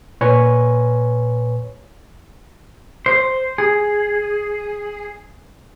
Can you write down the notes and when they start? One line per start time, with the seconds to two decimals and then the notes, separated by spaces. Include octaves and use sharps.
0.21 A#2 B4 C#5 G#5
3.06 C5
3.58 G#4